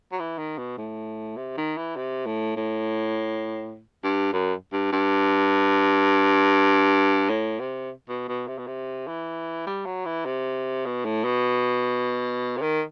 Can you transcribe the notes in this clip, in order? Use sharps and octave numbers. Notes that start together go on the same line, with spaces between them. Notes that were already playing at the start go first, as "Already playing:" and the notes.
F#3
E3
D#3
B2
A2
C3
D#3
E3
C3
A2
A2
G2
F#2
G2
G2
A2
C3
B2
B2
C3
B2
C3
E3
G3
F#3
E3
C3
B2
A2
B2
C3
D#3